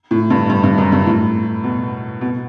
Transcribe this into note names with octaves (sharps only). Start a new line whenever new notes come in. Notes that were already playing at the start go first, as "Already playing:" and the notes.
A2
G2
G2
G2
F#2
G2
A2
B2
B2